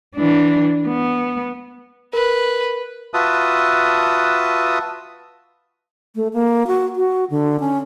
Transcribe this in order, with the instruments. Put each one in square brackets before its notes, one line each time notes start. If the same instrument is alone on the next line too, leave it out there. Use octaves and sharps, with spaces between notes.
[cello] E3 D4
B3
[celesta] A#4 [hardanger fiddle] B4
[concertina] F4 F#4 B4 E5 A5 D#6
[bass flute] A3
A#3
F#4
F#4
D3
C#4